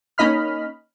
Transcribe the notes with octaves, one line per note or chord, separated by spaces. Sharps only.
A#3 C#4 D#4 D#5 B5 F6